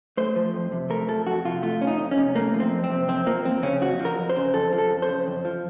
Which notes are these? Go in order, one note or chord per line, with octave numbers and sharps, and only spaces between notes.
A3 C5
F3
F2
C3
A3 A#4
F3 A4
F2 F#4
C3 F4
A3 F4
F3 C#4
D#4
F2
C#4
C3
A3 A#3
F3
C4
F2
C4
C3
F2 C4
F3 A#3
F2 C4
C#3 C#4
F2 F#4
F3
A#4
F2
C5
C#3
F2 A4
F3
A4
F2
C5
C#3
F2
F3